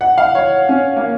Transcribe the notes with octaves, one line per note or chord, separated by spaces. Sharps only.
F#5
F5
C#5
C#4
A#3